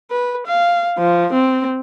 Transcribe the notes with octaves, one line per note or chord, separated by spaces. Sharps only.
B4
F5
F3
C4